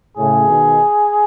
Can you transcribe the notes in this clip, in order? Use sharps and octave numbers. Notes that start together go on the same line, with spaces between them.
A2 C#3 G#4
B2 D#3